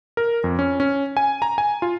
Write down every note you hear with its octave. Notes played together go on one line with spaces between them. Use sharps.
A#4
F2
C#4
C#4
G#5
A#5
G#5
F4